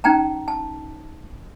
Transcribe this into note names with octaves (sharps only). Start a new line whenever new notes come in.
C#4 D#4 G5 A5 A#5
A5